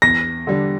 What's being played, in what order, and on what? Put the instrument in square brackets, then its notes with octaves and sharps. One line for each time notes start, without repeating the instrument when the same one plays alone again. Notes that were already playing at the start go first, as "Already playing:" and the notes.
[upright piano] E2 [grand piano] A#6
[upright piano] D3 G3 D4